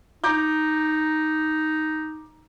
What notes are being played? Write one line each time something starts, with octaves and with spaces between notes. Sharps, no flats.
D#4 A#5 D6 G6